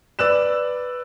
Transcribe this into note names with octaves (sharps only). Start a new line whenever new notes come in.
B4 D5 E6 F#6 E7